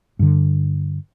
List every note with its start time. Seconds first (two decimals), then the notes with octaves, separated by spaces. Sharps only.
0.19 G2 D3